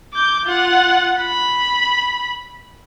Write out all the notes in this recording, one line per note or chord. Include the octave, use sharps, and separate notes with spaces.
D6 G6
F4 F#5
B5